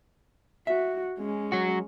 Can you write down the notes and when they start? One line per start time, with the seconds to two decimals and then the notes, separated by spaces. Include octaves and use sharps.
0.67 F#4 E5
1.18 G#3 C#4
1.52 F#3 F#4